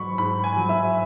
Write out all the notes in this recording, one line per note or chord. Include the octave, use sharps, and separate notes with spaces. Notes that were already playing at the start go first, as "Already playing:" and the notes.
Already playing: G#2 F#3 B5 C#6
G#2 B5
G#5
F#3
E5